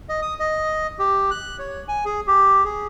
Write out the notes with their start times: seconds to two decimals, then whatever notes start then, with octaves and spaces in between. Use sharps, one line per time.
0.09 D#5
0.22 D#6
0.40 D#5
0.99 G4
1.31 F#6
1.59 C#5
1.88 G#5
2.05 G#4
2.27 G4
2.65 G#4